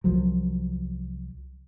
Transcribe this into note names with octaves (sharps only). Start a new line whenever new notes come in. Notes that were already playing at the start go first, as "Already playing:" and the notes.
C2 F3 F#3